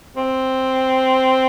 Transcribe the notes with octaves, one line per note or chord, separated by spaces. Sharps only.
C4